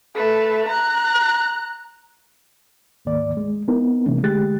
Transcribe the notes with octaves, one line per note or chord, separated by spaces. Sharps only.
A3 B4
A#5 F#6
D2 G#2 D#3 A#3 D5
G#3
B3 C4 D#4 E4 A#4
C3 E3 G#3 A#3 C#4
D3 G#3 A3 G4 F#6 A6